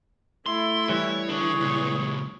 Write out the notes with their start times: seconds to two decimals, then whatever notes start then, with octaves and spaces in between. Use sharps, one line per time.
0.46 A3 E4 C6
0.89 E3 G3 C#5
1.29 D3 D4 G#4 C#5
1.60 C#2 A#2